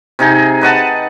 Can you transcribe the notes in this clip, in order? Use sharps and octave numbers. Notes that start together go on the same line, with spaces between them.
C3 D#4 G#4
B4 D#5 F#5 A5